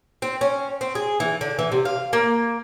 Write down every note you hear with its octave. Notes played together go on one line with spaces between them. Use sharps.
C4
C#4
C4
G#4
E3
D3
E3
C3
F5
A#3